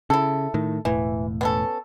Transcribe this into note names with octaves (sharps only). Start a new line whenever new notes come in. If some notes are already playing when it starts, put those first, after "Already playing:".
C#3 E4 A4
A2 D#3
E1 A2 E3
B3 C#4 A4